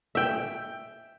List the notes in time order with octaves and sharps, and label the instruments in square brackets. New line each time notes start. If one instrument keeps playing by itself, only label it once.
[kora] E5 G5